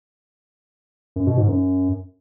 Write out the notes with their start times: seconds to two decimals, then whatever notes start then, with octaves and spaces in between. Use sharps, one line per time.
1.16 F#2
1.27 B2
1.38 G#2
1.48 F#2